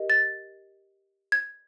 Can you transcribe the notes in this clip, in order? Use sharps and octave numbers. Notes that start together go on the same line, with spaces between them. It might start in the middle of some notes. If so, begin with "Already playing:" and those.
Already playing: G4 A#4 D#5
A6
G#6